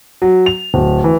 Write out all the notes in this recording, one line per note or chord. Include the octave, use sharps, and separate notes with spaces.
F#3
F7
D1
E3